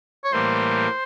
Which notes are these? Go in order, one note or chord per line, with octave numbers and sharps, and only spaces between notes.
C#5
A2 E3 G3 A#3 C5